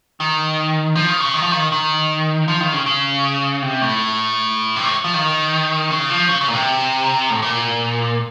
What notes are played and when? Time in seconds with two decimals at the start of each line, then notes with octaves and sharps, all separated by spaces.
0.20 D#3
0.95 F3
1.09 D#3
1.20 C#3
1.34 D#3
1.42 F3
1.52 D#3
1.72 D#3
2.48 F3
2.61 D#3
2.73 C#3
2.86 C#3
3.62 C3
3.81 A2
4.76 C3
4.85 A2
5.04 F3
5.14 D#3
5.90 C#3
6.09 F3
6.29 C#3
6.41 C#3
6.48 A#2
6.54 C3
7.30 A2
7.42 A#2